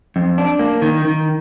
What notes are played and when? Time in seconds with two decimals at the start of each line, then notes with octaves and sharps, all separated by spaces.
0.16 F2
0.38 D4
0.59 A#3
0.82 D#3
1.05 D#3